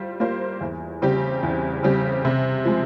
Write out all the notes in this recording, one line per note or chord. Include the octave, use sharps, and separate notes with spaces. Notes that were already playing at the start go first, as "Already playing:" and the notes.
Already playing: G3 F4 C5
A#3 F4 C5
E2
C#3 G3 C4 G4
E2
C#3 G3 C4 G4
C3
F3 G#3